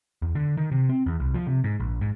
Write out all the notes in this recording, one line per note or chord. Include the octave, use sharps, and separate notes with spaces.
E2
D3
D#3
C3
C4
E2
C2
F3
C3
G#2
A#1
G#2